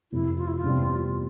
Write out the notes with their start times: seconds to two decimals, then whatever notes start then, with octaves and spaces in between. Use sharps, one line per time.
0.12 F1 F2 C3 E4
0.38 F4
0.48 E4
0.56 F4
0.63 F1 E2 C3 G3